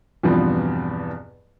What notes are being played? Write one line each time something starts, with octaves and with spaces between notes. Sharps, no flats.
E2 G2 B2 F3 B3 C4